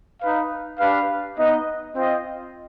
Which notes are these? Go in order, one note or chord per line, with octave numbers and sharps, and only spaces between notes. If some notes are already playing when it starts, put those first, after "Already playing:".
D#4 B4 F5
D4 G4 B4 F5
B3 D#4 B4 D#5
C4 F4 C5 D#5 G5